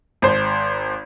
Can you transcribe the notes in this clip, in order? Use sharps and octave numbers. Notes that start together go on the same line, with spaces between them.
G#1 C5